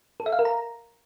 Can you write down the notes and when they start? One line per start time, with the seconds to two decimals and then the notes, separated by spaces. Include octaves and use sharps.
0.20 A4
0.26 E5
0.33 F5
0.39 A#4
0.45 A#5